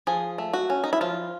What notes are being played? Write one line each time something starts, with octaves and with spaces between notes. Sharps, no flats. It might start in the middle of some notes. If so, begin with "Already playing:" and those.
F3 G#4
A3
F#4
C#4
D#4
E4
F3 F4